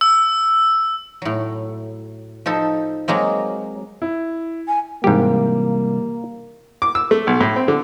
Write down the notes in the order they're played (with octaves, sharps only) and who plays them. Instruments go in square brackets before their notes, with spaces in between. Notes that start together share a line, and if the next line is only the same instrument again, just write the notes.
[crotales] E6
[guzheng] A2 F#3
F3 D#4 A4 C5
F#3 G#3 A#3 C4
[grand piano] E4
[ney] G#5
[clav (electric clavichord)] G#2 G4 [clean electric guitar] C3 E3 G3 [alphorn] A#3
[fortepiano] D6
E6
A3
B1
A2
C4
D3